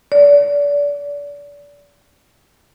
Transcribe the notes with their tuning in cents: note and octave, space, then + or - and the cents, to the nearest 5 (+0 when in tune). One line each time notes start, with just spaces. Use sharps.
D5 -30